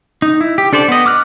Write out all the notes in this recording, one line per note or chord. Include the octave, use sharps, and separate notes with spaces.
D#4
E4
G4
D4 A4 C5 D5
B3 D#5
D6 F6 F#6